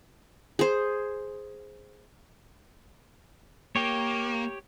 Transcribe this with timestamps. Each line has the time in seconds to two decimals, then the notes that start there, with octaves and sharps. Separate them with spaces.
0.59 G#4 C5
3.76 A#3 G4 C#5